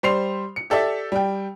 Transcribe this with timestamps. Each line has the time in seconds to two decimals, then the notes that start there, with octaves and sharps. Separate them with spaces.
0.03 G3 C5 C6 C7 F7
0.56 C#7
0.70 G4 A4 D5 E5
1.12 G3 G5